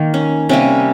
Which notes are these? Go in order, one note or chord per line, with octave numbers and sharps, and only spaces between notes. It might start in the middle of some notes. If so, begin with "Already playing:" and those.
Already playing: D#3 A#3
C#4
C3 G3 A#3 C#4